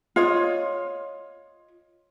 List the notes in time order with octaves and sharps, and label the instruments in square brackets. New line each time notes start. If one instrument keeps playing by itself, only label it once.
[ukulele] F4 C#5 D#5